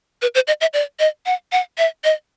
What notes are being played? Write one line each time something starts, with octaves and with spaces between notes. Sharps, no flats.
B4
C5
D#5
E5
D5
D#5
F#5
F#5
E5
D#5